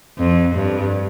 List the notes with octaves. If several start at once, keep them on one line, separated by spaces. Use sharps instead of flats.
F2
G2